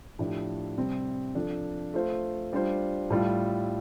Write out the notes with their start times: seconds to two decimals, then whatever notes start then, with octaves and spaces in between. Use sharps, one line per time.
0.19 A2 F3 A3 D4 G4
0.77 C3 G3 C4
1.35 F3 D4 A4
1.94 A3 F4 C5
2.53 G3 D4 F4 C5
3.10 A2 G3 F4 A4